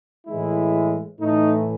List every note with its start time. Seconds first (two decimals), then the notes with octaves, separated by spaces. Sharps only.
0.27 A2 E3 G#3 E4
1.18 A2 E3 A3 D#4